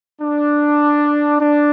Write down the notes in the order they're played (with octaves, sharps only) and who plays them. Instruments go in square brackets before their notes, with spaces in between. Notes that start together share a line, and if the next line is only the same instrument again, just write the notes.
[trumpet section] D4
D4